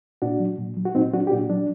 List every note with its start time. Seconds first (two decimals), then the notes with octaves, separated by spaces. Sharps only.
0.22 A#2 D4 F#4
0.40 F#3
0.58 A#2
0.77 F#3
0.85 F#4
0.95 A#2 C4 D#4
1.13 F#3 D4 F#4
1.27 G4
1.31 A#2 D4 F#4
1.50 F#3 D4